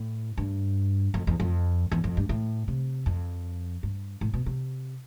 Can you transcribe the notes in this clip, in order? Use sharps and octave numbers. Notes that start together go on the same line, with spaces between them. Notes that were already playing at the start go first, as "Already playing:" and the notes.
Already playing: A2
G2
F2
E2
F2
E2
F2
G2
A2
C3
F2
G2
A2
B2
C3